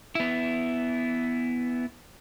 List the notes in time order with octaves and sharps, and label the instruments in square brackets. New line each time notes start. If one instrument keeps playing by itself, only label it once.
[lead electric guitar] B3 E4